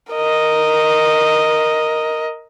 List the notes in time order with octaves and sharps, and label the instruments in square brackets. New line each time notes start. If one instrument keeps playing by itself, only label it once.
[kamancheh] A#4 D#5